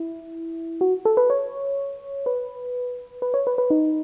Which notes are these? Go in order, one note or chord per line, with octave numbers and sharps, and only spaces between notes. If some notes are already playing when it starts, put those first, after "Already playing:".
Already playing: E4
F#4
A4
B4
C#5
B4
B4
C#5
B4
B4
D#4